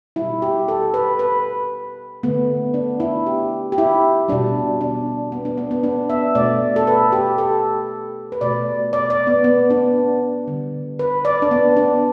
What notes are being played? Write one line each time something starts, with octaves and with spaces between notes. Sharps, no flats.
B2 G3 E4
G4
A4
B4
B4
D3 A3 B3
D4
E4
G4
G4
E4
B2 G3 D4
D4
B3
D4
B3
B3
D4
E5
B2 A3 D5
A4
B4
G4
A4
B4
B2 A3 D5
D5
D5
B3
B3
D4
D3 G3
B4
D5
D4
B3
D4